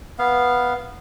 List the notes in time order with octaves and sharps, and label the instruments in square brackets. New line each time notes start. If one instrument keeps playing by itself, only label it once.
[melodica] B3 F5